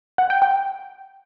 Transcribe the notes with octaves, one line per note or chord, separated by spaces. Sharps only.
F#5
G5
G5